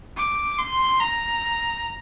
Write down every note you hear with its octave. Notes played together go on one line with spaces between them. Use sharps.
D6
C6
A#5